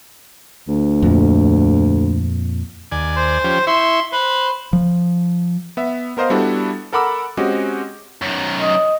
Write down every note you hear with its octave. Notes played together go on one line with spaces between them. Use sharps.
D2
F2 A#2
D#2 D5 G#5
C5
F3 C#4 G4
E4 E5 C6 C#6
B4 C5
F3
B3 E5
B3 A#4 C5 D#5 F5
G3 B3 D4 E4 F#4 A4
A4 A#4 F#5 B5 D6 E6
G#3 C4 C#4 F#4 G4 D#5
F#2 D#3
D#5